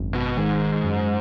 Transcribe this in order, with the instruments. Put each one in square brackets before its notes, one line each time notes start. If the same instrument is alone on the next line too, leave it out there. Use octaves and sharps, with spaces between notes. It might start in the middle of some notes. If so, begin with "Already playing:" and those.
Already playing: [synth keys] G#1 F#2
[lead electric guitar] B2
[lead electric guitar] G#2 [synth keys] D#3
[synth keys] F#2